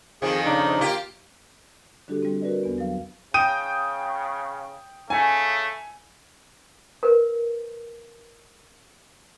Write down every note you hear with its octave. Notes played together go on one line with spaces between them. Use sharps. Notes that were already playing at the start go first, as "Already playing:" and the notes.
F2 D#3 F3 G#4
C#3 D4 D#4
A#3 F4 G4
D3 G3 D4 F#4 G4 A4
G3 C4
F#4 A#4 B4 D5 D#5
E2 B3
F#3 F5
C#3 G5 D#6 G6 D#7
C#3 A3 G#5
A#4 B4